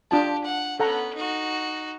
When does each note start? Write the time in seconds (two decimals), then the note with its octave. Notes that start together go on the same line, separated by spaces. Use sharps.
0.11 D4 F4 G4 A5
0.44 F#5
0.80 B3 C#4 A4 F#5 A#5
1.15 D#4 F#4